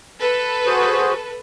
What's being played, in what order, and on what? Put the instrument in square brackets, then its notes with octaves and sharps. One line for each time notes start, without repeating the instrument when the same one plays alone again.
[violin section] A4 B4
[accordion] F#4 G#4 C5